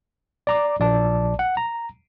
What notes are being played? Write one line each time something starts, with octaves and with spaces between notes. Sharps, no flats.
D5 A#5 D6
A#1 D5 A5
F#5
A#5